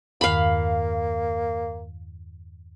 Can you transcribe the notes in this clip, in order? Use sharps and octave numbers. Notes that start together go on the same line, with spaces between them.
E2 G2 D#3 A#3 F5 B5